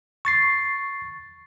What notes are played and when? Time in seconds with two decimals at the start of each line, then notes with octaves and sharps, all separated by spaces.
0.25 C#6 A6 C7